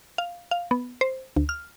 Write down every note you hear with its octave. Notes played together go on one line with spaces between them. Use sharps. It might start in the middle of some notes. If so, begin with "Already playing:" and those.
F5
F5
B3
C5
D2
F6